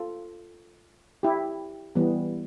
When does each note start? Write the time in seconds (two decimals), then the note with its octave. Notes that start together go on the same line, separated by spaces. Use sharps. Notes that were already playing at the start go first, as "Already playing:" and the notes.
Already playing: F4 A4
1.23 E4 G4
1.96 E3 G3 B3